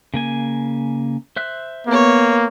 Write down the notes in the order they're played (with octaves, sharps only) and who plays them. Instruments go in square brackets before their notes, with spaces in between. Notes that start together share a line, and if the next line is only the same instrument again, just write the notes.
[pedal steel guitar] C#3 A#3 G#5
C5 E5 F#6
[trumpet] A#3 [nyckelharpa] B3 C#5